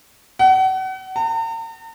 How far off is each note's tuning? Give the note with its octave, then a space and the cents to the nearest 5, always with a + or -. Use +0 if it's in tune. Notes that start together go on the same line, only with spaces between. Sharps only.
F#5 +35
A#5 -45